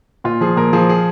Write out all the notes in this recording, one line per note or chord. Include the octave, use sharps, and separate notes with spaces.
A#2 F4
F3 G#4
A#2 A#4
F3 G#4
G#4